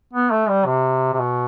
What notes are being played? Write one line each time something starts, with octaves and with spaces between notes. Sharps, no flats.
B3
A3
G3
C3
C3
B2